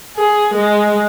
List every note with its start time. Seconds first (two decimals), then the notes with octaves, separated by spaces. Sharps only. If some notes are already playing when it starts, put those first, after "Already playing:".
0.17 G#4
0.54 G#3